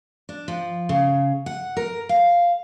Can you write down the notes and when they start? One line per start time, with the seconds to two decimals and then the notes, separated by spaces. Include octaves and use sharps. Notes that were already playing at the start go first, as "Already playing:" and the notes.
0.29 D4
0.48 F3
0.89 C#3
1.46 F#5
1.77 A#4
2.09 F5